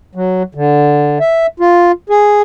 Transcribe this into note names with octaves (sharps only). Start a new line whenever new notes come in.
F#3
D3
E5
F4
G#4